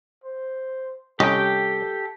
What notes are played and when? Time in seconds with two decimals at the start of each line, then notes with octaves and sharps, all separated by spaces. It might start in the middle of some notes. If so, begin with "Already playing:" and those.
0.24 C5
1.20 C2 C#4 G4 A4 D#5 G5